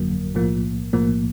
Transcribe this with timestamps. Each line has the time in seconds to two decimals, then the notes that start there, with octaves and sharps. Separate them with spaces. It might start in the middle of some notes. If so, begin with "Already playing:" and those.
Already playing: G1 F2 D3 F#3 A#3
0.34 B1 A2 F3 A#3
0.93 B1 A2 F3 A#3